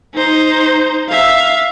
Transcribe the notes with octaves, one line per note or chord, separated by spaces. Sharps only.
D#4 C5
E5 F5